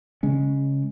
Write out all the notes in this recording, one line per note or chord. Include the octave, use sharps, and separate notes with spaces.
C#3 G#3 C#4